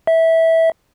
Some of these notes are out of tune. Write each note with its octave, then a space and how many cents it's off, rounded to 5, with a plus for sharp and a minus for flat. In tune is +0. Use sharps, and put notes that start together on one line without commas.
E5 -15